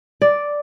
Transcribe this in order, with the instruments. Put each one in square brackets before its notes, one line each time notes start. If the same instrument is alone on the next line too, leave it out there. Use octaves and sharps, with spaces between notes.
[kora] D5